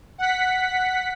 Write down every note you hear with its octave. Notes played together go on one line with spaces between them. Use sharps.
F#5 B6